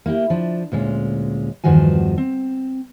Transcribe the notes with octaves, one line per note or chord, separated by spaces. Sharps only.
A#3 E4 F#4 G4
F3 D4
D2 A#2 G#3 C#4
E2 G2 D#3 F3 F#4 G#5
C4